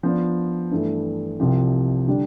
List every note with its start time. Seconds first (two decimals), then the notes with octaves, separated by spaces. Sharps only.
0.03 F3 B3 D4
0.71 G2 E3 A3
1.40 C2 C3 F3
2.07 D3 G3 D4